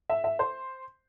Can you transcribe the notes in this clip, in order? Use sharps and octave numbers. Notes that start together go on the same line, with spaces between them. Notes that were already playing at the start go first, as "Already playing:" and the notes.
E5
E5
C5